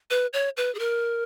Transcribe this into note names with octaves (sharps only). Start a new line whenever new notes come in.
B4
C#5
B4
G#4
A#4